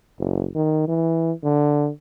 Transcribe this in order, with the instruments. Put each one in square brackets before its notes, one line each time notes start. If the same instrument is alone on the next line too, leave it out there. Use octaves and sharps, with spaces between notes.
[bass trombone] F#1
D#3
E3
D3